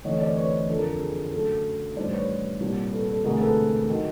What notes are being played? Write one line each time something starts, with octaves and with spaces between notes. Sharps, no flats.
D2 C3 E3 A3 C#5 D#5
C5 D5
B4 C#5
F2 D3 F3 A4
A#4
A4
G#4
F#2 D3 F#3 A3 A4
A1 G2 D#3 G3 C5 D5
B4 C#5
C2 A#2 G3
A4 B4
A4
E1 D2 C3 G#4 A#4
A4 B4
D#3 F#3